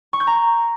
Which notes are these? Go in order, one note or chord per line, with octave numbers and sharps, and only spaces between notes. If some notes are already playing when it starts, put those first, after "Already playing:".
C#6
G6
A#5